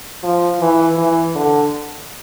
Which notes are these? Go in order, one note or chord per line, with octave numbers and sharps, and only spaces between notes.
F3
E3
E3
D3